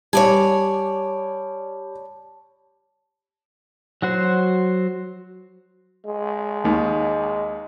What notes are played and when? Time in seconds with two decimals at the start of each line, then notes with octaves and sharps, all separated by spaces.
0.13 G3 C#5 D5 G#5 A5
4.02 F#3 F#4 C5
6.06 G#3
6.64 D#2 D#3